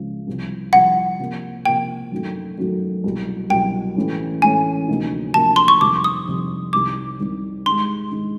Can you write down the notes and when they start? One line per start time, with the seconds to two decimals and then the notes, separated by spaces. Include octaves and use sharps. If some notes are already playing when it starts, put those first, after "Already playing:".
Already playing: C#2 C#3 F3
0.27 C2 C3 F3
0.73 C2 C3 F3 F#5
1.19 C3 F3 A#3
1.65 C3 F3 A#3 G5
2.12 F#2 D#3 F#3 A3
2.58 F#2 D#3 F#3 A3
3.04 C2 B2 F#3
3.50 C2 B2 F#3 G5
3.96 A2 E3 A3 C#4
4.42 A2 E3 A3 C#4 G#5
4.88 D2 C3 F3 A#3 D#4
5.34 D2 C3 F3 A#3 D#4 A5
5.56 C6
5.68 C#6
5.81 F2 C3 D#3 G3 D6
6.04 D#6
6.27 F2 C3 D#3 G3
6.73 C2 C3 D#3 G3 D6
7.20 C2 C3 D#3 G3
7.66 G#2 D#3 G#3 C6
8.11 G#2 D#3 G#3